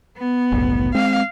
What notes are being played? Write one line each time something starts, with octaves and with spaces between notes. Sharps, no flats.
B3
F#1 C2 A2
G#3 C4 F5